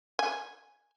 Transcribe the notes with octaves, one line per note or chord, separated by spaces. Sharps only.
G#5